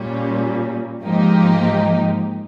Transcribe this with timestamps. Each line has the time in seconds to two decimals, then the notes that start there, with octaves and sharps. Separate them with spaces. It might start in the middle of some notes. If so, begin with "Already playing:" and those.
Already playing: A#2 G3 C#4
1.03 G#2 F3 A#3 D#4 G4